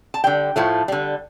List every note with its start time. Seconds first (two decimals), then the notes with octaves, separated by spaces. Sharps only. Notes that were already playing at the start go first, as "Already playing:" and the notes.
0.14 A5
0.24 D3 G3 G5
0.56 A2 F3 A3
0.88 D3 G3